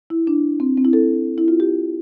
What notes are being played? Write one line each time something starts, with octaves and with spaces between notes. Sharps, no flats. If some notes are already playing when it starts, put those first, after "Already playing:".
E4
D4
C4
C4
E4
A4
E4
F4
G4